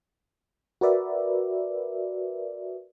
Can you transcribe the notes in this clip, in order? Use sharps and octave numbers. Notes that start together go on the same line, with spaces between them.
F#4 A#4 B4 D5 E5